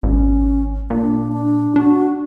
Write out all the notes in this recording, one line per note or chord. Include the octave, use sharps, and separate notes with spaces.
G#1 C#4
A#2 D4
D4
D4 F#4